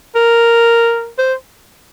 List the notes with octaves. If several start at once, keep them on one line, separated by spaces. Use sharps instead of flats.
A#4
C5